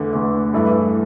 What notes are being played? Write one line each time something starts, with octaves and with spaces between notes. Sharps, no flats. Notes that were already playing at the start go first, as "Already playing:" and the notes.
Already playing: E2 D3 A3
E2 D3 A3
G2 E3 A3 E4